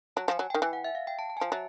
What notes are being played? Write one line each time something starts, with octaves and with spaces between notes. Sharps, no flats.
F#3 A5
F3 G#5
F#3 G#5
D#3 G5
E3 G#5
F#5
E5
F5
G5
A5
A5
G#5
F3 A5
F#3 E5